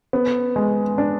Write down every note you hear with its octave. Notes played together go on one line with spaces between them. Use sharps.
B3
G#3
D4